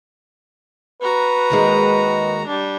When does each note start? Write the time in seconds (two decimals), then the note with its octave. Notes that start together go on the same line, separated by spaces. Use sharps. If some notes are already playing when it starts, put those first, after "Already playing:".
1.02 F#4 B4 A#5
1.50 D#2 D#3 G#3
2.47 G3 D4